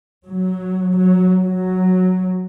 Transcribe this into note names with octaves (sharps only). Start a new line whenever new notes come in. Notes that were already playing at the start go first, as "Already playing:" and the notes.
F#3
F#3
F#3